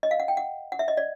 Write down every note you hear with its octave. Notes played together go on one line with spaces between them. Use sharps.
D#5
F5
F#5
G5
F#5
F#5
E5
D#5
D5